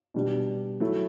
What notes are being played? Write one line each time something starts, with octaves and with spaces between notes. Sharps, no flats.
B2 G3 D4
F#3 A3 E4